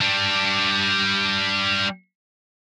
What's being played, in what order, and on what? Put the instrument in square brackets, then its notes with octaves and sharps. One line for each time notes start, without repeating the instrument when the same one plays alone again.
[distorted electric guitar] G3 D4